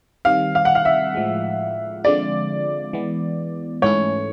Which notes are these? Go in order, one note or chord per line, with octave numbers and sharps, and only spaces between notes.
D#3 G3 C4 F5
F5
F#5
F5
E5
A2 F3 G#3
D3 F3 G#3 C4 F4 D5
E3 G#3 B3
G#2 E3 A3 C#4 E4 C#5